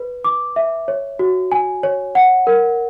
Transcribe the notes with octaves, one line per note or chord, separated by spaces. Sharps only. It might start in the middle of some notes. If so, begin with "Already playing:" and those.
Already playing: B4
D6
E5
C#5
F#4
G#5
C#5
F#5
A#4